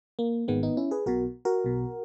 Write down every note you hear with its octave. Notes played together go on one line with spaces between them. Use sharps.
A#3
G#1 G#2 D#3 G#3 B3
B3 D#4
C#4 E4
G#4 B4
B1 B2 F#4 A#4
F#4 A#4
B1 B2